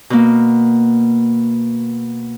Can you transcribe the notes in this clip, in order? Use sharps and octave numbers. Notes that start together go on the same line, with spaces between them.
B2 A#3